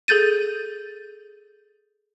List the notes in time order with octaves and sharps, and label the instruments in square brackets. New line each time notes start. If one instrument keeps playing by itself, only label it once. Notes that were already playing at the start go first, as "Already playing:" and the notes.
[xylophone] G#4 A4 G6 A6 D#7